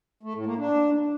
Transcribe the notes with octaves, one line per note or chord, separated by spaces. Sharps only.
A3
A2
A#3
D4